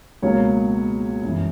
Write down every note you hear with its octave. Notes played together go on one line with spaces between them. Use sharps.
C#2 B2 F#3 A#3 C#5
G1 F#2 E3